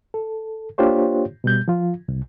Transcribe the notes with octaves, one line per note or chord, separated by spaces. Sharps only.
A4
A#3 D4 F4 G4 C5 C#5
B2 G3 G6
F3 F4
C2